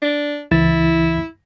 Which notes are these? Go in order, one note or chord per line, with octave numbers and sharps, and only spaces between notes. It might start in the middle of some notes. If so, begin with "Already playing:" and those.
D4
C#2 E3 E4 A6